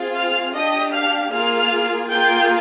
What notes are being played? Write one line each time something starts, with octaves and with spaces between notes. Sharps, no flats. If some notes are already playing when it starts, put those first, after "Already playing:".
Already playing: C4 F4 G#4
F5 F6
D4 G4 D#5 D#6
F5 F6
A#3 F4 G#4 F5 F6
A#3 F4 G#4 G5 G6